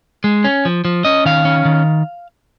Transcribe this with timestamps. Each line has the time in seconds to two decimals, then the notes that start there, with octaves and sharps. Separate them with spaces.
0.24 G#3
0.44 C#4
0.65 F3
0.85 F3
1.05 C#4 D#5
1.25 D#3 F5
1.45 C#4
1.65 D#3